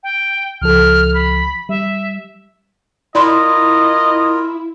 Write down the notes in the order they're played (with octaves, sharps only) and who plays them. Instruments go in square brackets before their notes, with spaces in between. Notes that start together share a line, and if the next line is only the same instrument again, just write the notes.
[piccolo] G5
[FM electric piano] C#2 F3 A4 [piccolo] F6
[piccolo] B5
[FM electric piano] G3 [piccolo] E5
[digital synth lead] E4 [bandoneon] F4 A#4 [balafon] D5 B5 C6 [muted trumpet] D#5